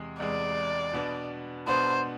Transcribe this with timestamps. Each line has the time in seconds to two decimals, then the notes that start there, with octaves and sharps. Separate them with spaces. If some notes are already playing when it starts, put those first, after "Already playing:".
Already playing: E2 C3 G#3
0.20 E2 C3 G#3 D5
0.93 B2 B3 D4
1.67 B2 B3 D4 C5